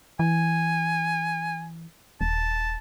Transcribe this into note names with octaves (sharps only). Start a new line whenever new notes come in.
E3 G#5
D#1 A5